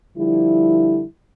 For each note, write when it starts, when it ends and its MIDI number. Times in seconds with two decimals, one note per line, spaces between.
0.16 1.03 50
0.16 1.03 53
0.16 1.03 55
0.16 1.03 64